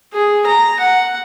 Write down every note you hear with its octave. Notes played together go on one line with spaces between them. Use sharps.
G#4
A#5
F#5